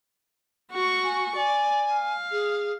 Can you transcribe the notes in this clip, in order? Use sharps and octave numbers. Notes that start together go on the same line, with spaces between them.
F#4 C#6
G#5
D5 G#5
F5
G#4